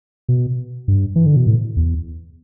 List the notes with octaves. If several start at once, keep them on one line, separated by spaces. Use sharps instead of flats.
B2
G2
E3
D3
B2
A2
E2